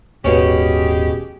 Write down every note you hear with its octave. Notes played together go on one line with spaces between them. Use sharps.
D#1 G#2 B2 C#4 G4 G#4